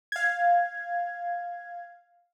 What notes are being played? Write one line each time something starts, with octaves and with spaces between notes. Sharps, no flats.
F5 G#6